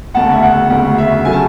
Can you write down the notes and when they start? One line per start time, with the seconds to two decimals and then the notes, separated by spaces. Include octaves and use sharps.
0.14 E1 D2 C#3 F#5 A5
0.32 E5
0.43 F#5
0.70 E1 D2 C#3 F#5
0.98 E5
1.25 C#3 F#3 A3 C#4 G#5
1.33 A5